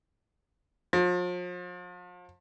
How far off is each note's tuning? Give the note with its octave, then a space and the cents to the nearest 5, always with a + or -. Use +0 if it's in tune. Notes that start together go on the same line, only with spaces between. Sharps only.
F3 +40